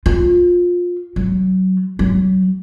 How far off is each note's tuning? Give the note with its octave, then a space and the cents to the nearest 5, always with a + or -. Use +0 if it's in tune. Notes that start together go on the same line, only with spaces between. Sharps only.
F4 +20
F#3 +20
F#3 +30